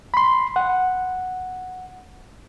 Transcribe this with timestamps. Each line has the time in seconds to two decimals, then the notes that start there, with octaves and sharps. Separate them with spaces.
0.14 B5 C6
0.56 F#5